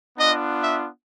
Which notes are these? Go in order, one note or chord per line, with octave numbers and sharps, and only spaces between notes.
B3 D4 F4 D#5
E5